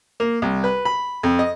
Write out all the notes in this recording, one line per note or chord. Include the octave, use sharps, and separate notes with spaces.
A#3
C2
B4
B5
F2
D#5